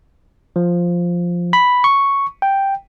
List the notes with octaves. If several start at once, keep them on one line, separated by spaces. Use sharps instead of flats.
F3
B5
C#6
G5